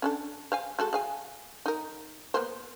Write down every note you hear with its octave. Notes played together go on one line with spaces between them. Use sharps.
C#4 D4 A4
C5 F5 G#5
G#3 F#4 A4
G#4 F5 G#5
D#4 A#4
A#3 B3 C5